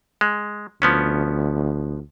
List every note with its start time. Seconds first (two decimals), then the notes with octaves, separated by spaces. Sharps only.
0.21 G#3
0.82 D2 F3 B3 C#4